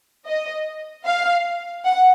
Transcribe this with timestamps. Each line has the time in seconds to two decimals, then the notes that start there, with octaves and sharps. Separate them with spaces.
0.26 D#5
1.05 F5
1.84 F#5